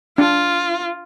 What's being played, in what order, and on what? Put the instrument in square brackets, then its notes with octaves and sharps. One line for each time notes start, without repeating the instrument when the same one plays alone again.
[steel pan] D4 [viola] F4